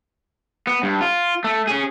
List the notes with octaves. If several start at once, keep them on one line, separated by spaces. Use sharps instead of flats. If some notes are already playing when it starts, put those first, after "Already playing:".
B3
G2
F4
A3
C#4 G#4